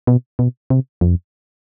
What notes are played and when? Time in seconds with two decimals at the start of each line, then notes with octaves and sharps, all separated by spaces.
0.07 B2
0.39 B2
0.70 C3
1.01 F2